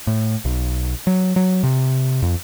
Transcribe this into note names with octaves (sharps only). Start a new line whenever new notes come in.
A2
B1
F#3
F#3
C3
F2